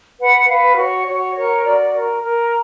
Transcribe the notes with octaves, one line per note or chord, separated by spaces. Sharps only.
B4 F#5
B4 F5
F#4 C#5
F#4 C#5
A#4 C#5
F#4 D5
A#4
A#4